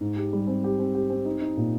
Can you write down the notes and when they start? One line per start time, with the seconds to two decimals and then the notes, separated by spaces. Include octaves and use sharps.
0.01 G#2
0.16 G4
0.33 G3
0.47 C4
0.64 G4
0.79 C4
0.95 G4
1.10 C4
1.25 D#4
1.42 D#4
1.57 A#2